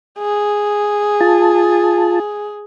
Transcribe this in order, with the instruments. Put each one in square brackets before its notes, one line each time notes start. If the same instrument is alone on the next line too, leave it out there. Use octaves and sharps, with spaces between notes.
[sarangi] G#4
[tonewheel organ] F4 A5